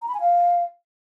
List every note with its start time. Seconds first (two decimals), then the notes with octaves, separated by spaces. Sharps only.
0.02 A#5
0.08 B5
0.14 G#5
0.21 F5